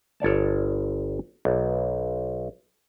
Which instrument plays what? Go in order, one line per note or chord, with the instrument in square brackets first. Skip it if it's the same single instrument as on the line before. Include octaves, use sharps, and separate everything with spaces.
[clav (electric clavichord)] G1 C#5 D5 A5
B1